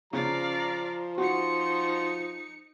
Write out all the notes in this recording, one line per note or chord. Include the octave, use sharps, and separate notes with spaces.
C#3 F3 D5 F5 A#5
D#4 F#4 C6 C#7